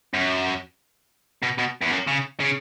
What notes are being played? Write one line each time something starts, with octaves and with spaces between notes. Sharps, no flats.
F#2
B2
B2
E2
F#2
C#3
C#3